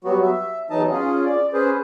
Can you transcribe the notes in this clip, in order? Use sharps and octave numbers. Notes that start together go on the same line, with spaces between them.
F#3 G3 B3 F#4
E5
E2 E3 F#3 D#4 D#5 A5
C#4 F4 G#4
D5
C#4 G#4 B4 C5